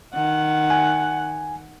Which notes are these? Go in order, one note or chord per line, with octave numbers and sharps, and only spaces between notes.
D#3 F#5
G#5